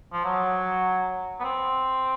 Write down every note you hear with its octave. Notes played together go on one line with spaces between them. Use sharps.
F3
F#3
B3
C4